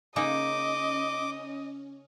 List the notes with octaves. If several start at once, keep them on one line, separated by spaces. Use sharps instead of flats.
C#3 A#3 C#4 D#4 D#5 D6